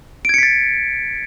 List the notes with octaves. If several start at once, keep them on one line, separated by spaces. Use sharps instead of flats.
G#6 A6 B6 C#7 D7